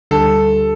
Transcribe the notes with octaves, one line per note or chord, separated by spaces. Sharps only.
D2 D3 G3 A4